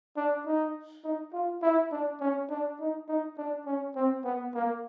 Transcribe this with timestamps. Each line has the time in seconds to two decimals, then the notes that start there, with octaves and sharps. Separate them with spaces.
0.16 D4
0.46 D#4
1.04 D#4
1.33 F4
1.62 E4
1.92 D4
2.20 C#4
2.50 D4
2.80 D#4
3.08 D#4
3.38 D4
3.66 C#4
3.96 C4
4.24 B3
4.54 A#3